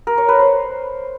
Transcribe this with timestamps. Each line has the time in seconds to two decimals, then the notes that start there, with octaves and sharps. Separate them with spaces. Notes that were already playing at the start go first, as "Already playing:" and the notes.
0.07 A#4
0.18 C#5
0.29 B4
0.39 C5